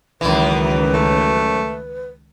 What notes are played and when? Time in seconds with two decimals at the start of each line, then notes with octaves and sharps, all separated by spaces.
0.21 C#2 F#2 D#3 E3 B4
0.93 A3